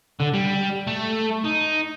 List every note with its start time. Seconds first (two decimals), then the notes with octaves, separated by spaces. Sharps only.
0.20 D3
0.34 G3
0.87 A3
1.44 D#4